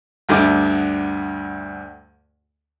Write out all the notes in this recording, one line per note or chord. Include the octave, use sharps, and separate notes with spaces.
D2 G2 D3 A3 D6